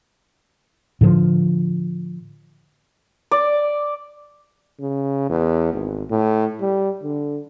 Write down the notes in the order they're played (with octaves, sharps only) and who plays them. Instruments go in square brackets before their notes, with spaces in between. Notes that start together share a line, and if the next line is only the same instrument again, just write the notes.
[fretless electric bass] A2 D3 F3
[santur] D5
[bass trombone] C#3
E2
G#1
A2
G3
D3